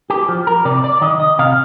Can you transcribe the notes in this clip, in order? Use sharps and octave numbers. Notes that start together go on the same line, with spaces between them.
G4
F3
A#4
C3 D5
D5
D#3 D#5
D#5
C3 F5